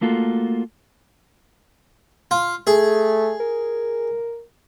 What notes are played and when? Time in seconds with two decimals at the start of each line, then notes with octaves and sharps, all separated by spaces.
0.01 A3 A#3 F4 F#4 A4
2.31 F4
2.67 A3 G#4
3.40 A#4